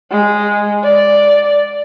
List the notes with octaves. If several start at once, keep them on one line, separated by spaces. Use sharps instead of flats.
G#3
D5